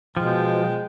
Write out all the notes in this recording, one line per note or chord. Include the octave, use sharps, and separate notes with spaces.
B2 F3 G#3 G5